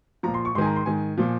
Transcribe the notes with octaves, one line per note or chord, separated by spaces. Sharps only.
A#2 F3 A#5
C6
C#6
G#2 D#3 G#5 C6
A#5
C6
G#2 D#3 G#5
A#2 F3